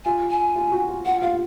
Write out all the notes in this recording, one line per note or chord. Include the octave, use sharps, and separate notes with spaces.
F4 G#5
G#5
F4
F#4
F4
F4 F#5
F4 F5